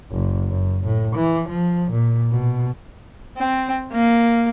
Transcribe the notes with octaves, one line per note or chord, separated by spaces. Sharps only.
F#1
F#2
A2
E3
F3
A#2
B2
C4
A#3